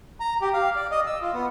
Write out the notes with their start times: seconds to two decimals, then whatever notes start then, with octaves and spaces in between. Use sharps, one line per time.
0.20 A#5
0.41 G4
0.54 F5
0.76 D5
0.91 D#5
1.06 E6
1.21 F4
1.34 B3